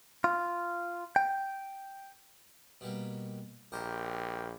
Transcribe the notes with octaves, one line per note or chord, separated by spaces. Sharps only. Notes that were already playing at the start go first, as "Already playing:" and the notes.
F4
G5
B2 G3 A#3
A#1 G4 A#4 C5 D#5 G5